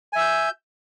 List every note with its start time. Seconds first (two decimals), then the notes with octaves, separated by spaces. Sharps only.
0.13 G#5
0.16 E5
0.18 E6
0.21 G6